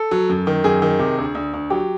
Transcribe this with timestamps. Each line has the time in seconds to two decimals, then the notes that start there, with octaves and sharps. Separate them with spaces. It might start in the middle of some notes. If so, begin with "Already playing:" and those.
Already playing: A4
0.11 F#3
0.30 F#2
0.47 D#3
0.64 F#2 G#4
0.82 D#3
0.99 C3
1.18 D2
1.35 D2
1.54 D2
1.70 F#3 G4